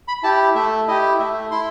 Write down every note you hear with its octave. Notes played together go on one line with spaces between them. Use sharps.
B5
E4 G4 A5
A3 E5
E4 G4 D#5
A3 E5
E4 C6